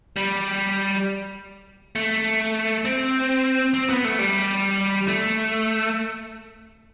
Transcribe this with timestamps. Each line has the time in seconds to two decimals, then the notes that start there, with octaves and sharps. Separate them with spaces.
0.16 G3
1.96 A3
2.85 C4
3.74 C4
3.90 B3
4.04 A3
4.19 G3
5.08 A3